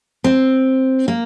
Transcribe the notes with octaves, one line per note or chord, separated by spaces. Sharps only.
C4
A#3